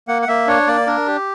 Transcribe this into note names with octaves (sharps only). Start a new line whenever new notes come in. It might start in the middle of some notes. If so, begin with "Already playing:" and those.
A#3 F#5
F#5
A#3 E5
D4 C#5
A#3 D5
D4 A#4
G4